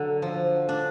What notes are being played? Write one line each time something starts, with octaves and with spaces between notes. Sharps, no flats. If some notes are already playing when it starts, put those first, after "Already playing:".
Already playing: D3 F#3
F3
D4